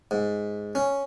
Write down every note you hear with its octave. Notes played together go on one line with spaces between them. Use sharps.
G#2
C#4